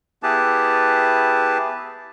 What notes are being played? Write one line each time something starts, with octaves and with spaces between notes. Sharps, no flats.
B3 E4 G4 G#4 B4 A5